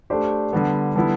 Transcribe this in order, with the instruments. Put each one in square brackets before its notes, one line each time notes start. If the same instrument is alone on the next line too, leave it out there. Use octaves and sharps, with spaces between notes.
[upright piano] A3 D4 G4 C5
D3 G3 B3
D3 G3 B3 E4